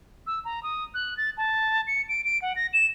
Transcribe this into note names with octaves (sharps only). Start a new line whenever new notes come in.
E6
A#5
D#6
F#6
A6
A5
C#7
D7
D7
F#5
A#6
E7